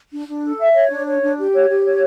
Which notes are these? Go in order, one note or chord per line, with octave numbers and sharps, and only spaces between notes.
D4
D4
A4
E5
C#5
D4
C#5
D4
G4
C#5
G4
C#5